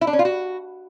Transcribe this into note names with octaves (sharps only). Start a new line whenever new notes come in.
E4
D4
C#4
F4
F#4